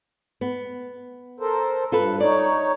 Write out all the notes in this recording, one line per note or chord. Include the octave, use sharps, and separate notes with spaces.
B3
A4 A#4 C5
G2 F4 A4 B4
D#4 C#5 D5